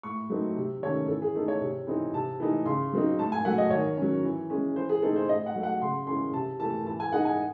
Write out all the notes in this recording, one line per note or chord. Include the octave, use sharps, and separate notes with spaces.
A2 C#6
F#3 A3 C4 D#4
C3
D#3 A3 C#4 C#5
E3 A4
G#4
A3 D#4 A4
C#5
C3
E3 C4 D#4
C3 A5
E3 A3 D#4
C#3 C6
F#3 C4 D#4
A2 A5
G#5
F#3 A3 F#5
D#5
D#3 C#5
F#3 C#4
E3
G#3 C#4
E3 C5
G#4
A3 C4 D#4 A4
C5
A2 D#5
F#5
F#3 A3
F#5
C#3 C6
E3 G#3 C#4 C6
C3 A5
E3 A3 A5
E3 A5
G#5
G#3 D#4 F#5
G#5